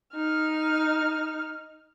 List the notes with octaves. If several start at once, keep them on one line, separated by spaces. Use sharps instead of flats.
D#4 F6